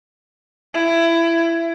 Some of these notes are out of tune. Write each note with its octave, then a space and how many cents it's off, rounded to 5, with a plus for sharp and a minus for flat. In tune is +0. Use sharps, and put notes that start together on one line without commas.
E4 +20